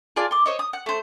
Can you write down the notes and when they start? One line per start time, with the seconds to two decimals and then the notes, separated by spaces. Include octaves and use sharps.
0.16 F4 G#4 D5 A5
0.31 C6 D6
0.46 C5 C#5 D#5
0.59 D#6
0.73 F#5
0.86 A3 C5